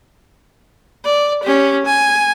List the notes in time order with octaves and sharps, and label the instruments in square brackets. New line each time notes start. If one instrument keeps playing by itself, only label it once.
[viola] D5
C#4 G4
G#5